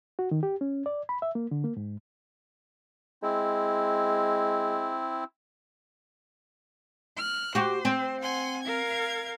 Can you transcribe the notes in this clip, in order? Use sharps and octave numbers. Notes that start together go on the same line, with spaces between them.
F#4
D#3
G4
C#4
D5
B5
E5
A#3
D3
A#3
G#2
G#3 C4 E4
F6 F#6
F#4 G4 C5
C4
F#5 G#5 C6
A#4 F5 G#6